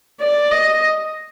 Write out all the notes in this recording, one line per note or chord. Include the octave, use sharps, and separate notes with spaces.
D5
D#5